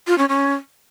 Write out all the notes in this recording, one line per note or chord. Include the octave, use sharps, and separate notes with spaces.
F4
C#4
C#4